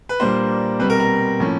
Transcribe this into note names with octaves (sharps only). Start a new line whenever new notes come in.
B4
A#2 G3 A#3 D4 C5
B2 G3 C4 B4
A#4
A#4
A2 F3 A#3 C#4